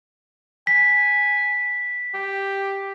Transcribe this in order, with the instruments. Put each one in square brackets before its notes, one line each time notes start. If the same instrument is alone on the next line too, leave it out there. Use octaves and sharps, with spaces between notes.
[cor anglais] G#5 [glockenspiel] B6
[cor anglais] G4